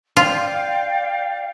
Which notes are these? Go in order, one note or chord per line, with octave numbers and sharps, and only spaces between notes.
F4 D5 F5 G5